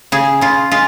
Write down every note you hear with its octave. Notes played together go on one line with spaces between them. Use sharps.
C#3 G#4
C#3 F4
G#3 F4